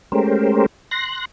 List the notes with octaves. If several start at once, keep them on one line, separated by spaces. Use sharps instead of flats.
G#3 A3 C#4 G4 A#4 C5
C6 F#6 A#6